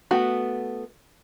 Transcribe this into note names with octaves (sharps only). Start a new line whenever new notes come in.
A3 B3 F#4